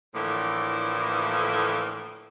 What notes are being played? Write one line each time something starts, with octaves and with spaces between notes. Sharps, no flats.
A2 D3 E3 F3 A#3